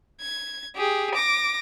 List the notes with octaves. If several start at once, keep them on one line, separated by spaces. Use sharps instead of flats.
G#6
G4 G#4
D6 A#6